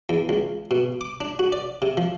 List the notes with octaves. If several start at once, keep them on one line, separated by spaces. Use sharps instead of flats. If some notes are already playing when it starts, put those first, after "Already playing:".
E2
C#2
B2
D6
D4
F#4
D5
C3
F3